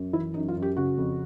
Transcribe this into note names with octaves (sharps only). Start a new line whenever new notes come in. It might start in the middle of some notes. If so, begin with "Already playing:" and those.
Already playing: F#2
E3 E4
F#2 D#4
F4
F#2
G4
C#3 F#4
F2